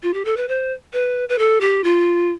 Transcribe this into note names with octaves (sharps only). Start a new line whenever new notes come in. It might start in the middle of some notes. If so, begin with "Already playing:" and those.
F4
G4
A4
B4
C5
B4
B4
A4
G4
F4